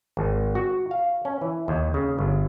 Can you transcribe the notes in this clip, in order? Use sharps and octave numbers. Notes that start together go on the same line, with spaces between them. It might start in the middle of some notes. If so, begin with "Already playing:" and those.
G#1
F#4
F5
C#4
E3
D#2
C#3
G1